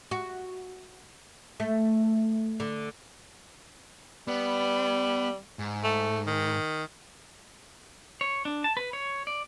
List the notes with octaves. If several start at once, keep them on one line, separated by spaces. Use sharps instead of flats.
F#4
A3
D3
G3 B3
G#2
A3
D#3
C#5
D4
A5
B4
C#5
D5